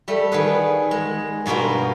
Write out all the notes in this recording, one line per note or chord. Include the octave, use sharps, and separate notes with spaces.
G3 A3 A4
D#3 B3 G#4 B4
G#3
G2 B2 A#3 F4 F#4